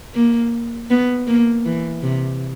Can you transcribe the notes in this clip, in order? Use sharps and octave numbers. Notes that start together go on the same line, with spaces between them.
A#3
B3
A#3
E3
C3